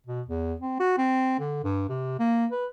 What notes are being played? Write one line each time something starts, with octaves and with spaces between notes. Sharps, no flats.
B2
E2
C4
F#4
C4
D3
G2
C3
A#3
B4